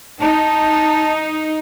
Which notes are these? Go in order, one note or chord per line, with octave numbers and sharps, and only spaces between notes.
D#4 A5